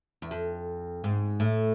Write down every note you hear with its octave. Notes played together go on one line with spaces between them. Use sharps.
E2
F2
G#2
A2